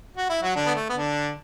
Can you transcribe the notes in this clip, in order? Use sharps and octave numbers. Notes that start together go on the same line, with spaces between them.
F#4
E4
F#3 F#4
D3 D4
B3
A3
B3
D3 D4